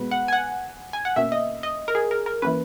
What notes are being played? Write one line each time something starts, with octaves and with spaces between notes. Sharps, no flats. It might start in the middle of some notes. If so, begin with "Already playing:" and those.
Already playing: B2 G#3 B3 B4
F#5
G#5
F#5
G#5
F#5
B2 A#3 C#4 E5
D#5
D#5
A#4
G#4
A#4
A#4
E3 A#3 C#4 B4